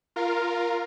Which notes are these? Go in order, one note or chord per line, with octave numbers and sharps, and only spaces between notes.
F4 A#4 F5